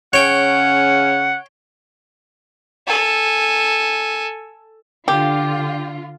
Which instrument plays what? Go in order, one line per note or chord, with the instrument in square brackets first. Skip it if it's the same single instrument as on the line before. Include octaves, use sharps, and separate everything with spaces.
[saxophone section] C#3 C#4 [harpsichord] C#5 G5 [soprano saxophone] F#5
[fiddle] A4 G#5
[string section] D3 F4 [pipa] G4